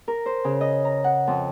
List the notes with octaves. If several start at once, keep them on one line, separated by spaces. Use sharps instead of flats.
A#4
C5
C#3
D#5
A#5
F#5
F2